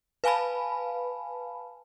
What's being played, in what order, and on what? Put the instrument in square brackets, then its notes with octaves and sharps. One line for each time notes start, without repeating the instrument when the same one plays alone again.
[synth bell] B4 F5 G#5 A5 B5